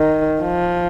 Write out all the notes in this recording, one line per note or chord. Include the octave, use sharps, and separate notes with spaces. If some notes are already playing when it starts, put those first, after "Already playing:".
Already playing: D#3
F3